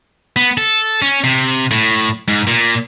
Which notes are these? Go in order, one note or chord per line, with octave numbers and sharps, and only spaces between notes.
B3
A4
C#4
C3
A2
G#2
A#2